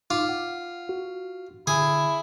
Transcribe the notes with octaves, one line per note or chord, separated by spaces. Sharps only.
D#4 F4 D6
F#5
F#4
D3 E4 G#4